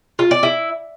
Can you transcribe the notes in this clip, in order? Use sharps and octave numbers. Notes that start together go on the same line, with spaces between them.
F4
D5
E4